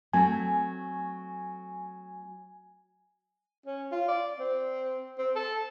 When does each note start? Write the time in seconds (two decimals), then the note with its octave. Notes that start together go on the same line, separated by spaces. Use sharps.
0.13 F#3 A3 C4 G#5
3.66 C#4
3.92 F4
4.08 D5
4.40 C4
5.18 C4
5.36 A4